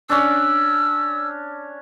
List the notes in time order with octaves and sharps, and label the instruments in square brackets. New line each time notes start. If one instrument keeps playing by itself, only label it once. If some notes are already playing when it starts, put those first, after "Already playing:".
[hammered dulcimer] C#4 D4 [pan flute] E6